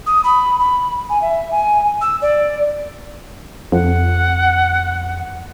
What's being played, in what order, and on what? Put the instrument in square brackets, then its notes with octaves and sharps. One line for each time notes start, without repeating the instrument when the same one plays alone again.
[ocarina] D#6
B5
B5
G#5
E5
G#5
E6
D5
[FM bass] F2 [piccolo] F#5